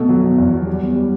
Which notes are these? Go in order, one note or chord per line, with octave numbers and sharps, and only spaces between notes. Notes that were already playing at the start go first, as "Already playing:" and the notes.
Already playing: B2 A3
F#3
B2
E2
F#3
G3
B3
G3